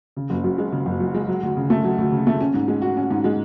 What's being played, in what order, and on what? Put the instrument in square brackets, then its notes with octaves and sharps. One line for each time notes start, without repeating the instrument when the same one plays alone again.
[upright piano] C#3
F#1
F#2
G#3
C#3
F#1
F#2
G#3
F#3
D2
C#3
A3
F#3
D2
C#3
A3
C#4
G#2
G#3
F#4
C#4
G#2
G#3